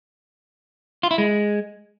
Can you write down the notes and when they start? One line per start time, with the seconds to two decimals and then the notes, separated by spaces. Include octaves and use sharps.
1.03 F4
1.11 E4
1.18 G#3